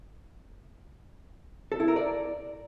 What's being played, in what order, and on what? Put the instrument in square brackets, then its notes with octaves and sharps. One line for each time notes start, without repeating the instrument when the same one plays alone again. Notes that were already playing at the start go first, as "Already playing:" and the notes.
[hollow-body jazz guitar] A4
E4
A#4
D5